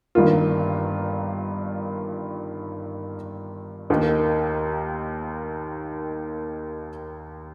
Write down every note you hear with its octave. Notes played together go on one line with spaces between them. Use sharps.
G1 G2 D#3 A#3 F4
D#2 D#3 A#3 D#4